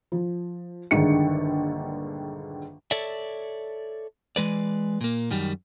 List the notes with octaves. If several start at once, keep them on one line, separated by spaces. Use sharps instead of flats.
F3
A#1 G2 D3 D#3 G#3 C#7
A4 C#5 D5 E5
E3 G#3 B4 D5
A#2 A#3
F#2 D#3 G3